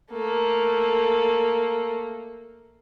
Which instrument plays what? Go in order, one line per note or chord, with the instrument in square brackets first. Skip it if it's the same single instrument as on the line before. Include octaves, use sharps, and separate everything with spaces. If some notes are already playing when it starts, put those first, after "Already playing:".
[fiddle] A3 A#3